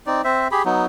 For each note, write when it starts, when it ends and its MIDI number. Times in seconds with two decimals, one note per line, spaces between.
0.07 0.22 60
0.07 0.22 63
0.07 0.22 74
0.24 0.48 60
0.24 0.48 72
0.24 0.48 76
0.52 0.63 67
0.52 0.63 68
0.52 0.63 83
0.65 0.86 54
0.65 0.86 59
0.65 0.86 63